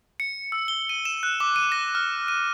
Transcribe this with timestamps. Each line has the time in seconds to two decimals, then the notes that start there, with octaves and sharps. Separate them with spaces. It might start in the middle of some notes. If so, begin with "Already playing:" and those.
0.20 C#7
0.52 E6
0.68 G7
0.89 D#7
1.05 E7
1.23 F#6
1.40 D6
1.56 D#7
1.72 A#6
1.95 F6
2.28 D#7